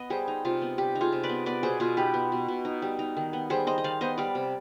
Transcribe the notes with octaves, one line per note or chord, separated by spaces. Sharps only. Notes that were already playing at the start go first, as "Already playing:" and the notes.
Already playing: B3 D#5
G3 G#4 C5
D#4
C3 F4
B3
G3 G4
D#4
F4 G#4
C3
B4 D5
B3
B3 B4 D5
B2 G#4 C5
B2 F4 G#4
D#4 G4 B4
B3
B2
B2
D#4
G3
D#4
D#3
B3
G3 G#4 C5
D#4 C5 D#5
D#5
D#3 D5 F5
B3 C5 D#5
G3 D5 F5
C3